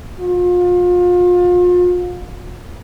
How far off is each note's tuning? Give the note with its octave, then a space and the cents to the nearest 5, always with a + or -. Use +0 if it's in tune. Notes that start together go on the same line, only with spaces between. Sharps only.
F4 +35